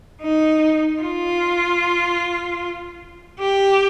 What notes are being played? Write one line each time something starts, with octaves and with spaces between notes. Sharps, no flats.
D#4
F4
G4